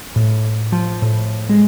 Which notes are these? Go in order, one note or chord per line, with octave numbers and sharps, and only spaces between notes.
A2
F3
A2
G#3